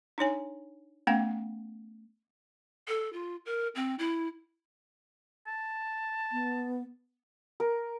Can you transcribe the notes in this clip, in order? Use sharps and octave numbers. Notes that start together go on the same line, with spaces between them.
D4 D#4 C#5 G#5
A3 B3 C#4 F5 G5
A4
F4
A#4
C4
E4
A5
B3
A#4